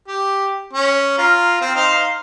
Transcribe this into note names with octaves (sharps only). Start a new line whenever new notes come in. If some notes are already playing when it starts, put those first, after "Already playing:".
G4
C#4
F4 A#4
C4
D#4 C5 F5